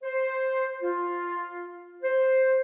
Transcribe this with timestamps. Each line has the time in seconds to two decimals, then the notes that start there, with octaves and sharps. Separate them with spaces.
0.03 C5
0.82 F4
2.03 C5